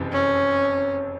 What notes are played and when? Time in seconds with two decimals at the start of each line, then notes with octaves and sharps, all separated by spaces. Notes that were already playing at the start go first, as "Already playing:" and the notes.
Already playing: F#1 F2 C3 E3
0.12 C#4